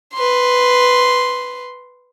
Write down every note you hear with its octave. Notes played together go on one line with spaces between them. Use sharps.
B4 C6